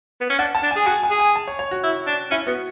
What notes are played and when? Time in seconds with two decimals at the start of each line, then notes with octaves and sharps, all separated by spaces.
0.21 B3
0.30 C#4
0.39 D4 F#5
0.55 A5
0.63 D4
0.71 G#5
0.76 G#4
0.86 F#4 G#5
1.03 G#5
1.11 G#4
1.19 G#5
1.36 A5
1.48 C#5
1.59 C#5
1.71 F#4
1.83 E4
2.07 D4
2.31 C#4 E4
2.47 B3 F#4